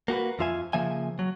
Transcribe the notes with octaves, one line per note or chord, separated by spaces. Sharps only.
A#3 F#4 G4 B4
F2 F3 F4 E5 G#5
C#3 F3 A#3 E5 G#5
F#3